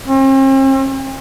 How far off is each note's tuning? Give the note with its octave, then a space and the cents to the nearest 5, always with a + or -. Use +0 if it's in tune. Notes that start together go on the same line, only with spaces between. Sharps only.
C4 +45